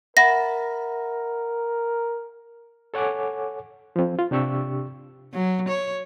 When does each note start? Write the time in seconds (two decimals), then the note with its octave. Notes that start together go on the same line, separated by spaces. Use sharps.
0.17 A#4 E5 F#5 B5 A#6
2.94 A4 C#5 F#5 G#5 D6
3.96 F3 C4
4.19 F4
4.31 C3 D4 G4 C#6 E6
5.33 F#3
5.69 C#5